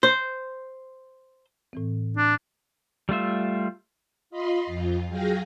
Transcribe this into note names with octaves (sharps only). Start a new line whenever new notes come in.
C5
A2 E3 C4
D4
G3 A3 F4 E5
F4 D#5 B5 C6
F2 F4
F#3 G#4 F5 G5 A#6